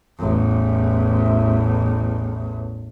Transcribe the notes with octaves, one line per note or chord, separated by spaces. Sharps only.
A1 E2